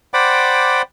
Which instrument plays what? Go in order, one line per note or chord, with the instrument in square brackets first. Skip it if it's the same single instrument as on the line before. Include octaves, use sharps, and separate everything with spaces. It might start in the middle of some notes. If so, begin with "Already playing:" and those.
[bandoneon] C5 D5 F#5 G5 B5 D6